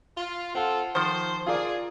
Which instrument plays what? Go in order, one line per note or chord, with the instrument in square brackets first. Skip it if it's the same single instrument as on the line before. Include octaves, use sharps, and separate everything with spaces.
[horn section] F4
[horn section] C4 F4 A4 [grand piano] F#5
[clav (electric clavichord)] D#3 F3 [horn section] C5
[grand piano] F4 A#4 D5 [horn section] G#4